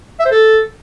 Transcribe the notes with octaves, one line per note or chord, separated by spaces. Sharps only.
E5
C5
A4